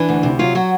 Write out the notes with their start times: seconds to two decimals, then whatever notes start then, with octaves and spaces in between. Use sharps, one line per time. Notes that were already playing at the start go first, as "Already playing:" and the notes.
Already playing: E3 D4
0.09 D2
0.23 C3
0.39 F#3 F4
0.55 F#3 F#4